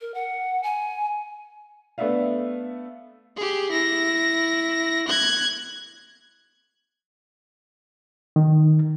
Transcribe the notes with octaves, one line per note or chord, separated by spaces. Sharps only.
A#4
F#5
G#5
A3 B3 D4 E5 F5
G4 G#4
E4 A#6
F#6 G#6
D#3